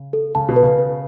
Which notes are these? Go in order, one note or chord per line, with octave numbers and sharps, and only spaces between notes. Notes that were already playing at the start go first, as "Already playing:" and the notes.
Already playing: C#3
A4
C#3 A5
B2
B4
C#3
B4